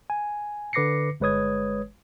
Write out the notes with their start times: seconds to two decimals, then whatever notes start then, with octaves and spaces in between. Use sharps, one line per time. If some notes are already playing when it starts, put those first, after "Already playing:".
0.10 G#5
0.73 D3 B4 D6 A#6 C7 C#7
1.20 G1 G#3 B4 C#5 D#6 G#6